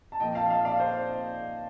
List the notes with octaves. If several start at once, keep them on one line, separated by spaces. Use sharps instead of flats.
A5
A#2 F3 D#5 G5
F5 A5
F5 A5
D5 F5
C5 D#5